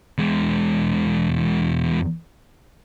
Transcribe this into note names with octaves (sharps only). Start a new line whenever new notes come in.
E2 G#3